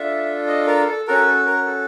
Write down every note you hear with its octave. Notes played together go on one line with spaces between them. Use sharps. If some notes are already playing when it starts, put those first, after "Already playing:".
Already playing: D4 F4 A4 E5
D#5
A#4
A4
C#4 F#4 A4 A#4
A4
A#4
A4